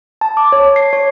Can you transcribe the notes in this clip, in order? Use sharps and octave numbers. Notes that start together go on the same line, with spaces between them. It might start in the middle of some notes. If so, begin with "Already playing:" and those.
A5
D6
C#5
C7
C#5